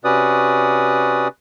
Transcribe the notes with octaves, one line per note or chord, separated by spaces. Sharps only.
C3 C#4 F#4 B4 D5 D#6